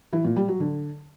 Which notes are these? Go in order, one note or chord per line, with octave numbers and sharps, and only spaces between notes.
E3
A#2
G3
F#3
D3